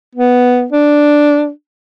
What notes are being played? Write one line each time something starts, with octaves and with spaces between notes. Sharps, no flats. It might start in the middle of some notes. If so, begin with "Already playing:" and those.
B3
D4